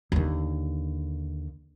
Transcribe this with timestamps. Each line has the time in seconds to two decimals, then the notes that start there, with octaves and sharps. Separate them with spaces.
0.12 D#2 D3